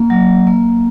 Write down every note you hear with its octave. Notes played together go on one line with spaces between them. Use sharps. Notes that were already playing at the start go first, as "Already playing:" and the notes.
Already playing: A#3
F#3
A#3